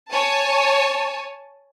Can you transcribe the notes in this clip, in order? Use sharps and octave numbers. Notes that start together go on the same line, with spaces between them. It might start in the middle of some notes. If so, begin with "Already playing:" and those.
C#5 G#5 A5